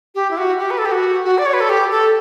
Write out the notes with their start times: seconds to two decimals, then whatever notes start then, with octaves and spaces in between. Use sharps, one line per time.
0.15 G4
0.31 E4
0.37 F#4
0.59 G4
0.71 B4
0.78 A4
0.85 G4
0.91 F#4
1.25 F#4
1.38 D5
1.46 C#5
1.53 B4
1.61 A4
1.69 G4
1.91 A4